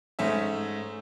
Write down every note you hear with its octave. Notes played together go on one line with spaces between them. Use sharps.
G#2 A3 C#4 E5